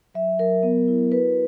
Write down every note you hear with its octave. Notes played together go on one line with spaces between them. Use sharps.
F#3 E5
F#3 A#4
B3
E4
F#4 B4